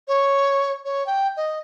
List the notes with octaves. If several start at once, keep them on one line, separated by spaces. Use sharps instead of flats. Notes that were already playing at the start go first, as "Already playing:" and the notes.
C#5
C#5
G5
D#5